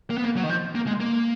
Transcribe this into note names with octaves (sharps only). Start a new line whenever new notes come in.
A#3
B3
A#3
F#3
D#3
F3
A#3
G#3
A#3